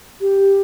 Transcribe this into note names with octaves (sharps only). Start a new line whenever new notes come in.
G4